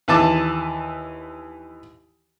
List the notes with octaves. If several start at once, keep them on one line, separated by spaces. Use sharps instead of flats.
D#2 E3 A5 D6